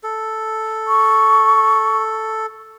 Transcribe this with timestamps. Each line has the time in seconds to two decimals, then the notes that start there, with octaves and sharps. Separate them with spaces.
0.03 A4
0.88 C#6